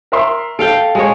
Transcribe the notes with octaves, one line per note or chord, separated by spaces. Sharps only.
A#4 E5 C6
A4 F5 G5 D7
G#3 C#5